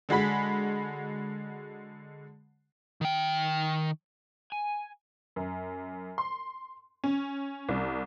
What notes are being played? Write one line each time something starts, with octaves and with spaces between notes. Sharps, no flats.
D3 G#3 F#4 B5 B6
D#3 G5
G#5
F#2
C6
C#4
C2